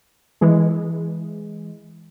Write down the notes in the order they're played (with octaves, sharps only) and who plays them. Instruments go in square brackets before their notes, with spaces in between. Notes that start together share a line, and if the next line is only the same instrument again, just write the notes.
[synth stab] E3 G#3